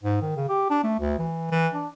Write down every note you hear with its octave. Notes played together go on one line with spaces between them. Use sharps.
G#2
D#3
C#3
G4
D4
A3
D2
E3
E3
D4